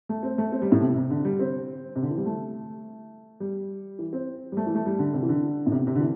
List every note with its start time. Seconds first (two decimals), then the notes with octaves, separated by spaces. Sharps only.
0.09 A3
0.23 C4
0.38 A3
0.52 C4
0.62 G3
0.72 A2
0.81 C3
0.96 C3
1.10 D3
1.25 G3
1.39 C4
1.96 C3
2.02 D3
2.11 E3
2.17 G3
2.26 A3
3.40 G3
3.99 E3
4.13 C4
4.52 G3
4.57 A3
4.67 E3
4.75 A3
4.86 G3
4.99 D3
5.13 C3
5.23 E3
5.29 D3
5.66 A2
5.72 C3
5.87 C3
5.96 D3
6.00 E3